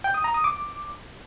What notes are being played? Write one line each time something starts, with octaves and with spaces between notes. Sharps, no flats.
G5
D#6
A#5
D#6
D6